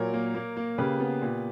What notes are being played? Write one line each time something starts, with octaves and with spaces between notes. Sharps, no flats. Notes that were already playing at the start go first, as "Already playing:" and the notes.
Already playing: A#2 F#3 A#4 C#5
A#3
A#3
A#3
C#3 G4 B4
B3
A#2